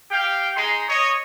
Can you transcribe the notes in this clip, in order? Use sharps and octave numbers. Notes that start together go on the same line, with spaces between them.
G4 F5 G5
G#3 D#4 C6
C#5 D#5